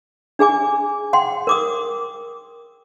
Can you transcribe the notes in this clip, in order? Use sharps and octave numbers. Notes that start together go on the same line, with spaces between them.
D4 G#4 G#5 D6
F#5 G5 C6
A#4 D6 D#6